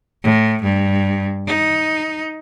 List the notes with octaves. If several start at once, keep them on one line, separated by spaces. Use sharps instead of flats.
A2
G2
D#4